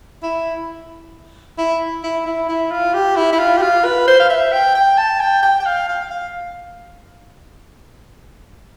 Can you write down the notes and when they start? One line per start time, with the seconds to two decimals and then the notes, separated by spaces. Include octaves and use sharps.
0.23 E4
1.58 E4
2.04 E4
2.26 E4
2.49 E4
2.71 F4
2.94 G4
3.16 E4
3.33 E4
3.39 F4
3.57 G4
3.62 F4
3.84 B4
4.07 C5
4.20 F5
4.30 E5
4.52 G5
4.75 G5
4.98 A5
5.21 G5
5.43 G5
5.60 G5
5.66 F5
5.88 F5
6.11 F5